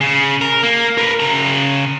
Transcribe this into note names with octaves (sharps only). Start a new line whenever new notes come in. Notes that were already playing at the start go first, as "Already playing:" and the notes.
C#3
A#4
A#3
A#4 B4
C#3 A#5